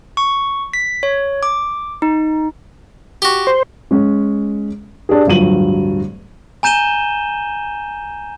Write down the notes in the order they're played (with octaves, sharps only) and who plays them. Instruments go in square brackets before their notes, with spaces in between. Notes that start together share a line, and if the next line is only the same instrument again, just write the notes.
[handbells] C#6
B6
C#5
D6
D#4
[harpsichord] F#4 G4
[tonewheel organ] C5
[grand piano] G#3 C#4
D4 G4 G#4
D1 G2 F3 F#3 D#7 F#7
[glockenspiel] G#5 A#5 G6 D#7 E7 G7